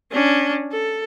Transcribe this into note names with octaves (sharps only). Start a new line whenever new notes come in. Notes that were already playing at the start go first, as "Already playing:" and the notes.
C#4 D4
A4